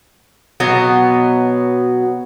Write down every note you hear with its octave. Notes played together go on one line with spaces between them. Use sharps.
B2 F#3 B3